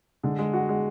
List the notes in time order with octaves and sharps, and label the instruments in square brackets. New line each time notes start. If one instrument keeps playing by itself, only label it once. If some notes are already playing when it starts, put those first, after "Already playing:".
[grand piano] D3 [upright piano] G#3
[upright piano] G#3
F#4
G#3